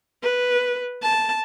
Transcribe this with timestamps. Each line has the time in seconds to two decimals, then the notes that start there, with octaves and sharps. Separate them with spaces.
0.22 B4
1.02 A5